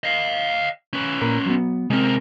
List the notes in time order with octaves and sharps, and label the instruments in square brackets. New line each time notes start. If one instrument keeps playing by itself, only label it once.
[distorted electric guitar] D#5 F5
C#4 B4
[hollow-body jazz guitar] A#2 A#4 B5
F#3 B3
[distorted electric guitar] C3 A#4 [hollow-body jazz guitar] G#3 C4